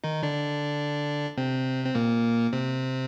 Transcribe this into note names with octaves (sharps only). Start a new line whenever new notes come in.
D#3 D#4
D3 D4
C3 C4
C4
A#2 A#3
C3 C4